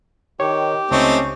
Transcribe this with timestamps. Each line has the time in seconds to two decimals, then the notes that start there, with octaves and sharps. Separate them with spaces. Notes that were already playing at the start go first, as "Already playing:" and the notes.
0.40 D#3 G4 C#5
0.91 C#2 A3 C4 C#4 D#4 C#6